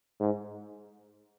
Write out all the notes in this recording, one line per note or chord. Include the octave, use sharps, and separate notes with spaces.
G#2